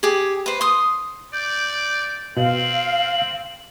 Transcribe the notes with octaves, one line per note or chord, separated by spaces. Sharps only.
G4 G#4
B4 C5
C6 D#6
D5 G6
B2 C4 F5 F#7